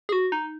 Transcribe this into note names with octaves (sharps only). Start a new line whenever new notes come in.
G#4
F#4
D#4